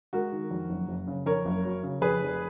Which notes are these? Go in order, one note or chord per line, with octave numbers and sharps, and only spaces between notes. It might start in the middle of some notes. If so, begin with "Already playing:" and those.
G#3 F#4 A#4
D#3
F2
F#1
F#1
C#3
F2 A#4 C#5
F#1
F#3
C#3
F2 G#4 B4
F1